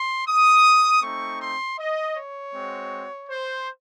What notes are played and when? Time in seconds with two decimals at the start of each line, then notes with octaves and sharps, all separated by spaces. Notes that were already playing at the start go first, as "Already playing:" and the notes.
Already playing: C6
0.28 D#6
1.03 A3 C4 D#4 C#6
1.41 C6
1.79 D#5
2.16 C#5
2.54 G#3 C4 F#4
3.29 C5